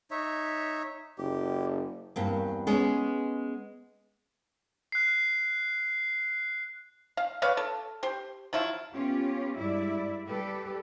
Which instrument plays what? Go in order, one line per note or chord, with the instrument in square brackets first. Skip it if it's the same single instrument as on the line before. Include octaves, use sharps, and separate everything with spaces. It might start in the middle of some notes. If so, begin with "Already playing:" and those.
[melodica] D#4 C#5 E5
[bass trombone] F#1 [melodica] G4
[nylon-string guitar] E2 G2 A#3 C4
G#3 B3 C#4
[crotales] F#6 C7
[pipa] F5
B4 C#5 D5 F5
A4
G4 C5
F3 F#3 E4 F4
[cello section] B3 C#4 F4 G4
G2 G#3 E4 D5 E5
G3 G4 A4 B4